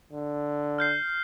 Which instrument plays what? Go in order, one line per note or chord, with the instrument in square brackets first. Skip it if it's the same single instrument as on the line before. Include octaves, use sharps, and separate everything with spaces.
[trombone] D3
[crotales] F6 G6 C7